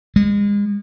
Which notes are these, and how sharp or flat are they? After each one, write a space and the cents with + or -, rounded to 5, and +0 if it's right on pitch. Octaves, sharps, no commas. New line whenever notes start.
G#3 -35